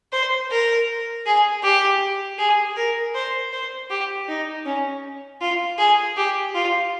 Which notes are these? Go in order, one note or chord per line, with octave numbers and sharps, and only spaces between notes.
C5
A#4
G#4
G4
G#4
A#4
C5
C5
G4
D#4
C#4
F4
G#4
G4
F4